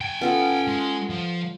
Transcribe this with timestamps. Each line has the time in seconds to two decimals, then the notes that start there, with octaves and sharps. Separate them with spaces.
0.01 G5 G#5
0.21 B3 C#4 F4 A4
0.68 G#3
1.10 F3